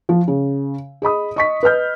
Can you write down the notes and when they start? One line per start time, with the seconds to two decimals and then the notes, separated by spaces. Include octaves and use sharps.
0.09 F3
0.28 C#3
1.02 G#4 D#5 B5 D#6
1.36 D#5 C#6 B6
1.63 B4 D#5 F6 G6